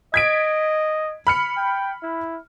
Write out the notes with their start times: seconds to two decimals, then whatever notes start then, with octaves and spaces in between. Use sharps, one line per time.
0.14 D#5 G#6 B6 D7
1.27 B5 F6 C#7
1.57 G5
2.03 E4